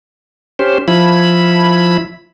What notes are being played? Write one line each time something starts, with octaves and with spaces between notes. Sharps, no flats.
C#4 G4 C5
F3 E4 B5